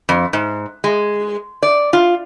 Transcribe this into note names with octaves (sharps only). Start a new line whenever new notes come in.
F2
G#2
G#3
D5
F4